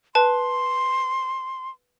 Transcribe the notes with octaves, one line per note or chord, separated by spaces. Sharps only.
B4 A5 C6